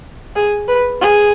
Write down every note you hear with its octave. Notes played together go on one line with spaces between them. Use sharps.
G#4
B4
G#4